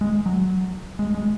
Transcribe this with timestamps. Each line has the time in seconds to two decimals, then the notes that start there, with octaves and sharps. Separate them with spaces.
0.01 G#3
0.26 F#3
0.99 G#3
1.14 G#3